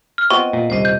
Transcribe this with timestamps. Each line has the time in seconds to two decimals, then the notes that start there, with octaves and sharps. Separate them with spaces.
0.18 F6
0.30 F3 B3 C4 D#5 C#6
0.53 A#2
0.70 D#1 C2 C5 D#5
0.85 G6